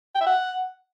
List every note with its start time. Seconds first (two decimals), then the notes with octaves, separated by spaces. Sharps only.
0.15 G5
0.21 E5
0.26 F#5